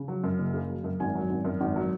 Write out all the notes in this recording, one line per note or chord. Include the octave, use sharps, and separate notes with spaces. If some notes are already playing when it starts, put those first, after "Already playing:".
Already playing: C#3
F#3
F#2
F#1
C#3
F#3
F#2
G#1 G#5
F#3
G#1
F#2
G#1
F#3